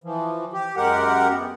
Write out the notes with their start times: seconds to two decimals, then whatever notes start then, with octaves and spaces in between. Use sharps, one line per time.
0.04 E3 F3
0.53 G4
0.77 F#2 G#3 G4 A#4 F#5
1.32 B3